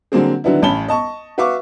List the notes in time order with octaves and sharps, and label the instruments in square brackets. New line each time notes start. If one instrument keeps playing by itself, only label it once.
[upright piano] D3 F#3 A#3 C4 G#4
D3 D#3 F#3 B3 D4 E4
A1 C#4 A5 B5 G7
D#5 A5 C#6
F#4 B4 E5 F5 C#6 D6